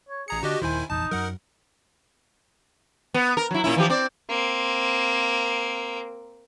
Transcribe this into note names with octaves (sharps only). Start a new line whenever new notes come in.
C#5
A1 G#4 A#5 C#7
D3 D4 F#4 G4 D#5
D#1 D#2 D#3 E4 C5 G#5
F1 A#1 E2 D#4 A5
F#2 F#3 A#4 F#5
B3
A#4
F#3 E4
A#2 C#4 E4
E3 F3 G4
C4 D5
A#3 C4